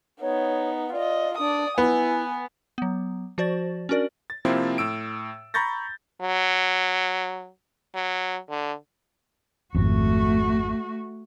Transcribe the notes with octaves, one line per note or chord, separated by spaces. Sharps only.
B3 D#4 C#5
F4 D5 D#5
D4 D5 D#6
B3 E4 G#5
F#3 B3
F3 F#4 C5 D5 A6
C#4 D4 F#4 A#4 D5
A6
C3 F3 A#3 C4 E4 F4
A2 E6 D7
A#5 B5 C#6 G6 A6 A#6
F#3
F#3
D3
G#1 F2 A3 F#4